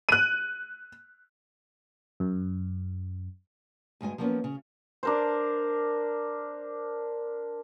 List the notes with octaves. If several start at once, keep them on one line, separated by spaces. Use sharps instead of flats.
F#6 D#7
F#2
D2 G2 G#3 G#5
F3 F#3 A#3 B3 C#4
C#3
D4 A#4 C5